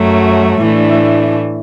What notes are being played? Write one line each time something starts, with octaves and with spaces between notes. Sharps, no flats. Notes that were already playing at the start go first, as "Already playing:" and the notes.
Already playing: F#2 F#3 A3
A2 E3 A3 D4